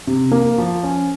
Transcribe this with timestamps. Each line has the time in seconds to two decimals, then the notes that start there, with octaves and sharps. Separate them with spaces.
0.07 C3
0.32 A#3
0.58 F3
0.83 C#4